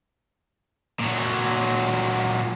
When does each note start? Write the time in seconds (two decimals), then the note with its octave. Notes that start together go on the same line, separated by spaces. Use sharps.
1.01 A#2 F#3